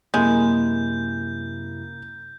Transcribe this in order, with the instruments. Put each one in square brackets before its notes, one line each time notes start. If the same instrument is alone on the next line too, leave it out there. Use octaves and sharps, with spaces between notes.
[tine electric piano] F#2 C3 E4 [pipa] G#3 [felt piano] A#3 [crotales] G6